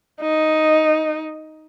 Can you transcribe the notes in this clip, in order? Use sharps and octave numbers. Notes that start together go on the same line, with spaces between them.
D#4